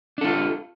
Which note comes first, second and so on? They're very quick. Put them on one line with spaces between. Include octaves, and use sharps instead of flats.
D4 A4 F4